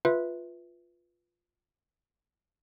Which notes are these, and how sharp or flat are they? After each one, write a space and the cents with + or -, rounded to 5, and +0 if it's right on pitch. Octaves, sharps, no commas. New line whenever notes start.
F4 +5 B4 +0 E5 -10